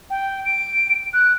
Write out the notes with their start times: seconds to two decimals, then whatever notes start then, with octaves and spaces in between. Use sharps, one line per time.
0.10 G5
0.45 D7
1.13 F#6